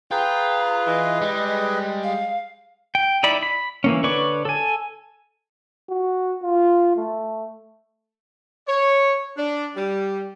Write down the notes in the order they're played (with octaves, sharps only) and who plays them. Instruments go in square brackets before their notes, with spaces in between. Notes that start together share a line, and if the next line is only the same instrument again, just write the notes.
[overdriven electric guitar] F4 [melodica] G#4 B4 [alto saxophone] G5 [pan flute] A#5
[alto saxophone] E3 [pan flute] D#5
[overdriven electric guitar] G3 [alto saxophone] G#3
[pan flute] F5
[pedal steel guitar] G5
D#4 E4 D5 B5
B5
E3 A#3 C#4
D3 B4 C#5 D5 C#6
A4 G#5
[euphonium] F#4
F4
A3
[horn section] C#5
D4
G3